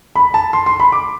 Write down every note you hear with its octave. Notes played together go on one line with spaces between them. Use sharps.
B5
A5
C6
C6
B5
D6